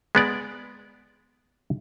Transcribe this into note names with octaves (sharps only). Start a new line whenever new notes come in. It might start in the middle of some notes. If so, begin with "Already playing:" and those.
G#3 B3 D5 A#5